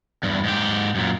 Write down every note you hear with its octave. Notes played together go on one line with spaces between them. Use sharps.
E2 G2
G#2 G4
F#2 A#2